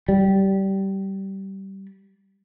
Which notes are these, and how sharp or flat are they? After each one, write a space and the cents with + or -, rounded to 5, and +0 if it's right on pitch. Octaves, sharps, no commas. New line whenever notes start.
G3 -20